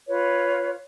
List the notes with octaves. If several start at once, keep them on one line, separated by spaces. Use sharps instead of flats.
F4 B4 C#5